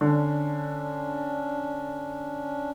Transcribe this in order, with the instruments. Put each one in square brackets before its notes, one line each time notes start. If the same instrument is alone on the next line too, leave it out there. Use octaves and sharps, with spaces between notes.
[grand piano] D3 [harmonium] C#4 D4